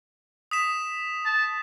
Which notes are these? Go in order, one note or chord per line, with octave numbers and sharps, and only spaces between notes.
D#6 B6 E7
A5